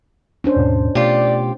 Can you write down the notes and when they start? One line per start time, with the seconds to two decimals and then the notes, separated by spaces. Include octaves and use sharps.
0.44 C#4 D4 C5
0.57 D#2 G#2 B2
0.95 B2 A3 F4 G4 D5